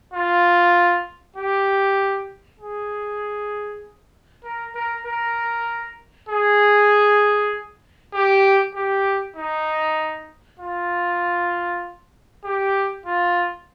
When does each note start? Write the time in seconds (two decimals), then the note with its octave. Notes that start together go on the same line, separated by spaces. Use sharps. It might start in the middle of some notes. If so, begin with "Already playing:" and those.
0.14 F4
1.36 G4
2.59 G#4
4.44 A#4
4.75 A#4
5.06 A#4
6.29 G#4
8.14 G4
8.75 G4
9.36 D#4
10.60 F4
12.44 G4
13.06 F4